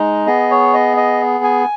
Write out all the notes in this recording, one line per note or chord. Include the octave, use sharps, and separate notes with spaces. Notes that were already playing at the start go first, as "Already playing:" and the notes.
Already playing: G#3 D#4
B3 G#4 D#5
C#5
D#5
D#5
G#5